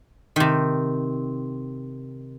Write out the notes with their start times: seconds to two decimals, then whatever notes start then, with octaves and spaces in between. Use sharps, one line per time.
0.36 C3 D#3